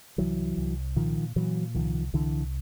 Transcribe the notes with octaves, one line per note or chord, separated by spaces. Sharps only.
C2 E3 F#3
C2
A#2 D#3 F3
A#2 E3 F#3
C2 D#3 F3
C2 D3 E3